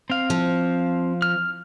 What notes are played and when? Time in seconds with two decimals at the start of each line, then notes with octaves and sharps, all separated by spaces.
0.10 C4 F5
0.30 F3
1.22 F6